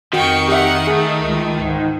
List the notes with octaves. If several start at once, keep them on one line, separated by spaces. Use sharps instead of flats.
F2 D#3 F#4 G5 C#6
D#4 G4 E5 F#5
A3 G#4
C#2
G#2